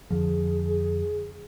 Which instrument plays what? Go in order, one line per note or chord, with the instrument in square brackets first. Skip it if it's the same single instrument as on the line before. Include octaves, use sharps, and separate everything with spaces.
[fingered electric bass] F2 D3 F3 [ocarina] G#4